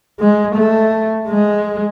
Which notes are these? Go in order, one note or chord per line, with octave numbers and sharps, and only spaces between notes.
G#3
A3
G#3